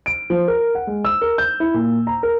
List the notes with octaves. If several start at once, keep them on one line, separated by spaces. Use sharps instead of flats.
D7
F3
A#4
F#5
G#3
E6
A#4
G6
E4
A#2
A#5
A#4